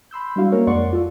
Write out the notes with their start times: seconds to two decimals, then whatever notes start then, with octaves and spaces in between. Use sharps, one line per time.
0.11 B5 C6 E6 G6
0.36 G3 G#3 D4 E4 F#4 F5
0.52 A#3 C#4 A#4 C#5
0.67 F2 G#3 D5 F#5 C6 C#6
0.93 F4 A4